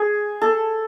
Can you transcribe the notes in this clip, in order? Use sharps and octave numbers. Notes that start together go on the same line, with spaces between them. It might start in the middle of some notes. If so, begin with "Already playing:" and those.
Already playing: G#4
A4